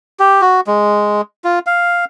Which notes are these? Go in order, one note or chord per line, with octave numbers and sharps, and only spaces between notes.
G4
F#4
G#3
F4
F5